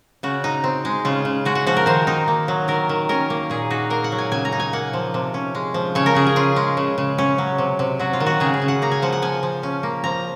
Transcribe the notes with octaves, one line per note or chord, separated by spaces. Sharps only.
C#3 F#4
D#4
C4
G#3
C#3 F4
C#3
G#3 F#4
F#4
F3 F#4
A#4
D#3 C5
D#4
A#3
F#3
D#3 A#4
D#3
C#4 A#4
A#3
A#2 G#4
D#4 F#4
A#3 A#4
F#5
F#3
G#5
C#3 G#5
A#5
D#4
G#5
A#3 F#5
F3
C3
C#4
G#3
F3
C#3 C#5
A#4
C#3 G#4
G#4
C#4 F4
G#3
C#3
C#3
C#4
F#3
C3
C3
F#3 F#4
F4
D#3
F#4
C#3 G#4
G#4
C#3
F#5
A#3 A#5
G#5
F3 F#5
F#5
F3 G#5
F3
C#4
A#3
F3 A#5